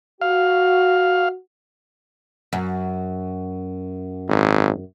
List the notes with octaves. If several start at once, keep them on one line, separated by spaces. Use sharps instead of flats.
F#4 F5
F#2
G#1